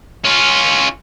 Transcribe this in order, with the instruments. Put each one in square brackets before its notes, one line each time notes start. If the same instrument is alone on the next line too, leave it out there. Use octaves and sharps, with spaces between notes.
[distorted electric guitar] C#4 F4